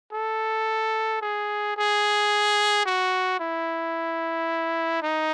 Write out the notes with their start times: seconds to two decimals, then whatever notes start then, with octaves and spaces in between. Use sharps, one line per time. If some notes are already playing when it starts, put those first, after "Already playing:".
0.13 A4
1.22 G#4
1.77 G#4
2.85 F#4
3.40 E4
5.03 D#4